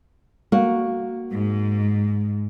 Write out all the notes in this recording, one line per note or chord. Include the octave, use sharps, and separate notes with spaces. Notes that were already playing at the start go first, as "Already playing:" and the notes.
A#3 F#4
G#2